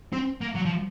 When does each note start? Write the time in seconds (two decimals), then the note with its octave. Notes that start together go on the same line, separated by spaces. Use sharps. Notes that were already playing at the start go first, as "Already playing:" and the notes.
0.13 C4
0.41 A#3
0.55 F#3
0.65 F3